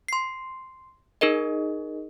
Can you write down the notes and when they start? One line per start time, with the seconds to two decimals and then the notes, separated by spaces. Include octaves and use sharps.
0.08 C6 C7
1.21 D#4 G#4 A#4 D#5